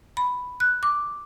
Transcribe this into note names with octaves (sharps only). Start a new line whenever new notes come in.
B5
F#6
D6